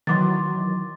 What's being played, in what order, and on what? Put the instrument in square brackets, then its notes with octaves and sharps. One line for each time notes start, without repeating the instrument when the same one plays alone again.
[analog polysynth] D#3 E3 F#3 [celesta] C6 D6 A6